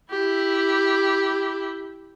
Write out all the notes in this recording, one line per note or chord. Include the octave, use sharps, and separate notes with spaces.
E4 G4